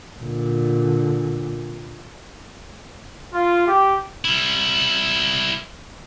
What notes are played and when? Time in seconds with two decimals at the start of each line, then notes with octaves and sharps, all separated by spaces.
0.19 A#2 D3
3.34 F4
3.66 G4
4.25 G3 E4